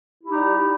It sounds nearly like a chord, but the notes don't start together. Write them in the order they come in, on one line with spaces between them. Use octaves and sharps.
E4 G4 D#4 G3